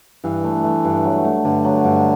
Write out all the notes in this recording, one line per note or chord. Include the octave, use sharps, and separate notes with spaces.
G2 E3
A3
A3
G2
F#3
A3
G2 D3
F#3
G2